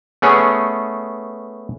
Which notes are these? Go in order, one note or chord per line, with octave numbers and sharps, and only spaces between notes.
A3 B3 C#4 G#4